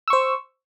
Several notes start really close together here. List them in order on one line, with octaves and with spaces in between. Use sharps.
E6 C#6 C5